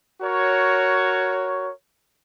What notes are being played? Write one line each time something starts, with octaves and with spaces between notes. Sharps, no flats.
F#4 A#4 C#5